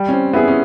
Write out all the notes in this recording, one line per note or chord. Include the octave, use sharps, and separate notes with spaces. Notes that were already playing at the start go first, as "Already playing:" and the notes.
Already playing: G3
C#4
C4
B3 E4 G#4
C#4